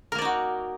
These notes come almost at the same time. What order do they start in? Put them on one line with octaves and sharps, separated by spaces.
A#4 A#3 D5 D#4 F#4